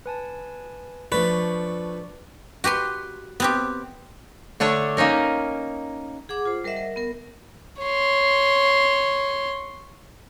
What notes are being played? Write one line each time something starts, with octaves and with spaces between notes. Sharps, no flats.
B4 G#5 A5
F3 A3 D4 B4 D5 C#6
F#4 G4 B4 C6
B3 C4 G4
D3 A3 D4 C#5
A#3 C#4 D#4 A#4
G#4 F#5 D6
F4 C5
G3 A#4 C5 D#5 E5 F#5
A#4
B3 A#4
C#5 C6